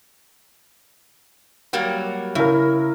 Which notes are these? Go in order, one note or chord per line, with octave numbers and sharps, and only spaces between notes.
F#3 G3 A#3
C#3 E4 A#4